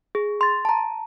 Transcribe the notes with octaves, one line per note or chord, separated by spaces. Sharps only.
G#4
C6 A6
A5 A#5